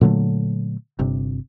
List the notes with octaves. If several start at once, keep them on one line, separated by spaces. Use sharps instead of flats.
A#2 D3 F#3 A3
G1 C3